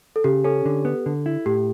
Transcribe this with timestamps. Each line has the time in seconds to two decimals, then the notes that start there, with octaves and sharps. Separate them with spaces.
0.16 A4
0.24 C#3 G4
0.44 C#4 A4
0.65 D3
0.85 B3
1.06 D3
1.26 E4
1.46 A2 G4